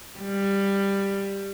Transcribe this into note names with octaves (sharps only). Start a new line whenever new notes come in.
G3